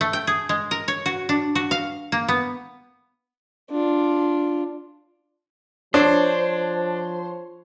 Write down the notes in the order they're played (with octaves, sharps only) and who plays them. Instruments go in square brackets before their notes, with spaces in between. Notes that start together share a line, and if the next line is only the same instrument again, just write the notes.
[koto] A3
G5
G#4
G#3
A#4
C#5
F#4
D4
F#4
F5
A#3
B3
[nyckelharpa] D4 F4
[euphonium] F3 [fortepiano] D4 [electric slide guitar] C5 [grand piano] C#5